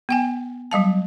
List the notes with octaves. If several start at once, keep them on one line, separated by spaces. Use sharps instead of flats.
B3 G5 G#5
F#3 G3 F5 A5